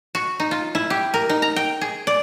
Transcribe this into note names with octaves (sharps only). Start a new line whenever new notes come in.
F#4
D#4
F4
E4
G4
A#4
D#4
A#5
G5
G#4
D5